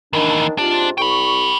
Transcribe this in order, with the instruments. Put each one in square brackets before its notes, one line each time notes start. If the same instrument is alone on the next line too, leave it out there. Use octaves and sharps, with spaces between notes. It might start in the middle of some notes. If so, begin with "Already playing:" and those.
[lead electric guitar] D#2 E3 [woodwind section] D#3 D4
[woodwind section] G#2 C3 F4 [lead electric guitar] D4
[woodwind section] C2 C#6 [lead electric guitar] G5 B5